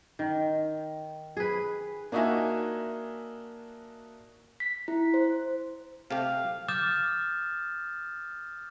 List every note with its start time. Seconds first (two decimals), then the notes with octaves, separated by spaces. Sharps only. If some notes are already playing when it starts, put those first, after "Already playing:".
0.19 D#3
1.37 G#4 B4
2.12 A#3 D4 D#4 F#4 E5 G#5
4.60 B6
4.88 E4
5.14 C5
6.11 C3 A3 G4 F5
6.68 D6 D#6 F6 G6 A6 E7